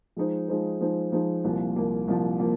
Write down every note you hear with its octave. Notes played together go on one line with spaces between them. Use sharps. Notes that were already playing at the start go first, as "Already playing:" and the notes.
F3 G#3 D#4 C5
F3 G#3 D#4 C5
F3 G#3 D#4 C5
F3 G#3 D#4 C5
C2 A#2 F3 A#3
C2 A#2 F3 A#3
C2 A#2 F3 A#3
F3 A#3